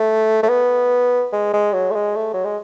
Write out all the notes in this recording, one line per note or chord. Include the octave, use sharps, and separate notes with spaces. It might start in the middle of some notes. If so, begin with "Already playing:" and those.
Already playing: A3
A3
B3
G#3
G#3
F#3
A3
G#3
A3
F#3
G#3